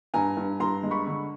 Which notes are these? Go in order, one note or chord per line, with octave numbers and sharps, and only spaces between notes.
G2 G#5 A#5
G2
G2 A#5 C6
G#3
B5 C#6
D3